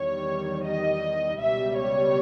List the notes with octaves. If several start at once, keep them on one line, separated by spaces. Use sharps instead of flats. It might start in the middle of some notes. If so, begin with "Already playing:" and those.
Already playing: E2 D#3 G3 C#5
D#5
C#2 B2 G3 E5
C#5